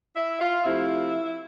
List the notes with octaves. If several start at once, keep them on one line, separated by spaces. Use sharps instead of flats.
E4 E5
F4 F5
C3 F3 A3 E4 E5